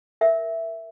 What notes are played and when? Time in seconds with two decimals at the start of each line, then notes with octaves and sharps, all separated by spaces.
0.21 A#4 E5